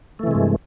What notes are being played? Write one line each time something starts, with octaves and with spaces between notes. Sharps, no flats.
G2 C3 E3 G#3 A3